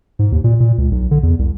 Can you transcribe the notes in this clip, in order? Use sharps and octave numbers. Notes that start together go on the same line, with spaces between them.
G#2
D#2
A#2
A#2
C#2
B1
D3
E2
C2